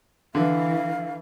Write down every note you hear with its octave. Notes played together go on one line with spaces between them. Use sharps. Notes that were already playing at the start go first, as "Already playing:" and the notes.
D3 E3 F5